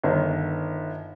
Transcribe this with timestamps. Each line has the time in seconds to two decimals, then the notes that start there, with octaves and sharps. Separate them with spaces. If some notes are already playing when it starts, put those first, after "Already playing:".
0.03 G1 D#3